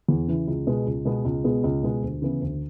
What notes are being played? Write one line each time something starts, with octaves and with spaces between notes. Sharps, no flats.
E2
C#3 E3
C#2
B2 G#3 B3
C#2
B2 G#3 B3
C#2
B2 G#3 B3
C#2
B2 G#3 B3
D2
C#3 E3 B3 E4
D2